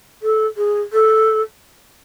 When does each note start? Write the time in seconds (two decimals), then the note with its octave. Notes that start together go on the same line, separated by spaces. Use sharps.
0.22 A4
0.57 G#4
0.93 A4